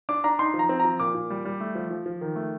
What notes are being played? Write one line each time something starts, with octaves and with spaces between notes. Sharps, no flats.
D4 D6
D4 A#5
D#4 C6
F3
A#5
C4
F3 A#5
A#2 D6
A#2
G3
G3
A3
F3
F3
F3
D#3
A3